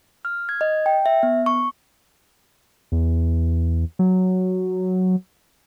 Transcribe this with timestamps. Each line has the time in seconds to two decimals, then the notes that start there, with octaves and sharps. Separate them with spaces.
0.25 F6
0.49 G#6
0.61 D#5
0.86 G5
1.06 E5
1.23 B3
1.46 C#6
2.92 E2
3.99 F#3